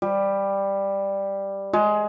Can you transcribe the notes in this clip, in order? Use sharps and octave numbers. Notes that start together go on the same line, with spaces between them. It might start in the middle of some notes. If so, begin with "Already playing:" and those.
G3
G#3